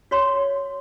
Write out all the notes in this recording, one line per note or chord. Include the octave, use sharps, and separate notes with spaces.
F#4 C#5 C6